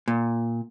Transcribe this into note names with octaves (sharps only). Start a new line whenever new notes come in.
A#2